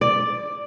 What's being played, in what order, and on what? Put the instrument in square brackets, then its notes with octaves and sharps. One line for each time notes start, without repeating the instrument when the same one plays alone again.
[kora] D5